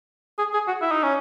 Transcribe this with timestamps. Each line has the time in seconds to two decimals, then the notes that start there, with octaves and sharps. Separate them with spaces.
0.39 G#4
0.54 G#4
0.68 F#4
0.82 E4
0.92 D#4
1.03 C#4